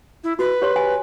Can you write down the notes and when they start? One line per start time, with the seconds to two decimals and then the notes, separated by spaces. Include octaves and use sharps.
0.24 E4
0.39 F#4 B4
0.62 G4 C#5 C6
0.76 G#5